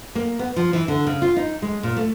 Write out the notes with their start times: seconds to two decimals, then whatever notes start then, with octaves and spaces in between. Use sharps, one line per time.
0.15 A#3
0.39 B3
0.56 F3
0.73 E3
0.88 D3
1.07 C#3
1.22 F4
1.37 D#4
1.62 G#3
1.83 A#2
1.97 A3